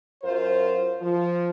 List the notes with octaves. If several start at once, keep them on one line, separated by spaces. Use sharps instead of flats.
F#2 F4 A#4 C5
F3